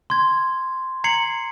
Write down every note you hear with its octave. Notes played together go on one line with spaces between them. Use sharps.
C6 G#6
A#5 G#6 C7 C#7 F#7